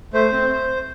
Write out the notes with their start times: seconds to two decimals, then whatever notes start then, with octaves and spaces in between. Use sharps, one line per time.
0.13 A3 C5
0.32 C4